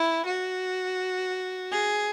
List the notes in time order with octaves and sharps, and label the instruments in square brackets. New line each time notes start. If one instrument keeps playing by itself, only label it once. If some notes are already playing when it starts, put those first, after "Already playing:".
Already playing: [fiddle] E4
F#4
G#4